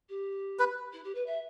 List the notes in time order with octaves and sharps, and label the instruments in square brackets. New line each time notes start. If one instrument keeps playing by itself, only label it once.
[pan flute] G4
[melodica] B4
[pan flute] E4
G4
B4
E5